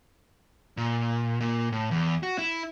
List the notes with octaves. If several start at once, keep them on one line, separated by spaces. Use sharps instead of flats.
A#2
A#2
A2
E2
F#4
E4